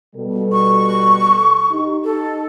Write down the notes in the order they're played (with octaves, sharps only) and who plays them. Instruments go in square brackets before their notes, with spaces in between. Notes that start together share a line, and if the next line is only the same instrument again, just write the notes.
[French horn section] B2 G3 A4
[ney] C#6
[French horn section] D#4 G4
[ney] A4